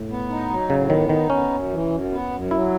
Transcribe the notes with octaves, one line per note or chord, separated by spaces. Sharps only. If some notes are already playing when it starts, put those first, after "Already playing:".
Already playing: A2
B3
D#4
F#3
A2 C#3
D#3 B3
D#3 D#4
B3 C#4
F#2
E3
F#2
B3
F#2
F#3 E4